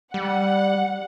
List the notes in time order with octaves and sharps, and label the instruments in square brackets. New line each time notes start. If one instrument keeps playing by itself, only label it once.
[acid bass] G3 [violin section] F#5